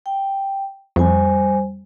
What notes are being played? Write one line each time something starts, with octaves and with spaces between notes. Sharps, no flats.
G5
F2 G3 C5 G#5